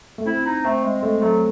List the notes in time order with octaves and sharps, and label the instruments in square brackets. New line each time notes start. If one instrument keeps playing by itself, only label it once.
[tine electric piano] A3
[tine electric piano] C4 [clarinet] E4
[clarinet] D#4
[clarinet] A3 [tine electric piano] C4
[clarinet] G#3
[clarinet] G#3 [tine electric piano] A3
[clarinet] F#3 [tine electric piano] A3